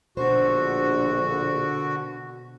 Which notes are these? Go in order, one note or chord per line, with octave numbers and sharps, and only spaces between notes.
A#1 B2 D3 F#4 C5